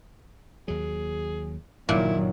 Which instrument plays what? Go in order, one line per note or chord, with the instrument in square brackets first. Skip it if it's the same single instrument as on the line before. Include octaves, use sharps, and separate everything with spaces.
[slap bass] D#2 F#3 [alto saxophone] G#4
[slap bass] F#1 G2 [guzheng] A#2 [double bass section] D#3 F#3 [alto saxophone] E4